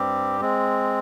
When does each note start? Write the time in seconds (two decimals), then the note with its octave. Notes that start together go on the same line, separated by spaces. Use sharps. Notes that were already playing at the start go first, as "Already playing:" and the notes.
Already playing: G2 G3 C4 G4
0.41 G#3 C4